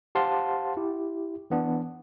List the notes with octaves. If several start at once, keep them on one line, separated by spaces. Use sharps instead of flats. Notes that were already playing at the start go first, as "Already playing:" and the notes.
G4 C5 F5 F#5 A5 C6
E4 G4
E3 B3 D4